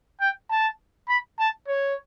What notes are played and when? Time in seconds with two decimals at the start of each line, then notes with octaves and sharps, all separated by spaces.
0.21 G5
0.50 A5
1.09 B5
1.39 A5
1.68 C#5